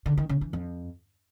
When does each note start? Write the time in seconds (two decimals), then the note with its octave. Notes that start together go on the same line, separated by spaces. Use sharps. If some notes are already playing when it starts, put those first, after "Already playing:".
0.06 D3
0.18 D#3
0.29 C#3
0.41 E3
0.53 F2